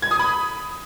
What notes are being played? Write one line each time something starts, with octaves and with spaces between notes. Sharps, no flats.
G#6
D#6
B5